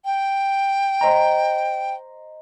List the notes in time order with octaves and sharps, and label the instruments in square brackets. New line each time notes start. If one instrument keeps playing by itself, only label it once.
[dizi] G5
[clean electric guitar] C5 D#5 A#5